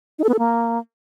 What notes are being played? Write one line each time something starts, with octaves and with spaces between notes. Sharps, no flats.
D#4
A4
B3
A4
A#3